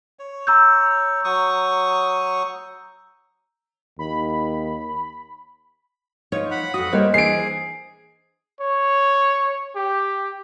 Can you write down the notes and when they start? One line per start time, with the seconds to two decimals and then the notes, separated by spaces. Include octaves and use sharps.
0.19 C#5
0.47 A#5 E6 G6
1.24 F#3 C#6 D#6
3.99 D#2 B5
6.32 F3 D#4 C#5
6.51 F#5 B5
6.74 F2 F#4 D#6
6.93 G3 A#3 C5 C#5 D#5
7.14 E3 D4 G#4 C7 D7
8.61 C#5
9.76 G4